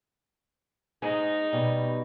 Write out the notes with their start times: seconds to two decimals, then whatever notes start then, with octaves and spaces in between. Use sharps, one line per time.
1.02 G#2 D#4 G#4
1.53 B2 G3